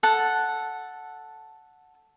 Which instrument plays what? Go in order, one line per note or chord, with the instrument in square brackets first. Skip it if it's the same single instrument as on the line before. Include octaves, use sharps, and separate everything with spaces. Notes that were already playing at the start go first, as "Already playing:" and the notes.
[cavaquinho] A4 F#5 A5